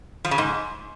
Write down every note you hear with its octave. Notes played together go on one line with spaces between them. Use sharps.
F3
C#3
G#2